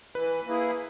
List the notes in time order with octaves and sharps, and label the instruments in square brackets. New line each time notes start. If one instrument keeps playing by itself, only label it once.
[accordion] E3 [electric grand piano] B4
[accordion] A#3 E4 G#4